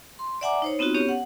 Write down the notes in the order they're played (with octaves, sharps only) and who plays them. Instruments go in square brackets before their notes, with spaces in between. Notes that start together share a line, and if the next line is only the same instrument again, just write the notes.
[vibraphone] C6
D5 E5 F#5 G#5 A#5 D6
D#4 C5 C#5
B3 C4 D#4 F4 F#4
B3 C#4 G4 C#5
F#5